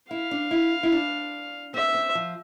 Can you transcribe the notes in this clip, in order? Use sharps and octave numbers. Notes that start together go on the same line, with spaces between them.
E4 F5
D4
E4
E4
D4
C4 E5
C4
F3